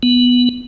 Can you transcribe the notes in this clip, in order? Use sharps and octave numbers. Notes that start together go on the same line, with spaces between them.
B3